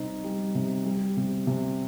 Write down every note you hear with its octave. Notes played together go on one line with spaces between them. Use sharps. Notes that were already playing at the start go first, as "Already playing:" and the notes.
Already playing: C3 G3 D#4 C5
G3
C3
G3
C3
C3